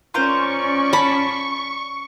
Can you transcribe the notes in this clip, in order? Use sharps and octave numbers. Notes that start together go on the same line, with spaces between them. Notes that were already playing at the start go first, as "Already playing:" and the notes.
C#4 F4 A#4 C5 D5 C#6
A5 B5